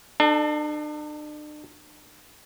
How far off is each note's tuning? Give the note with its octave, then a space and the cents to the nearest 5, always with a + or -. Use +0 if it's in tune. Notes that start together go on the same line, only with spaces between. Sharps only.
D4 +40 A4 -5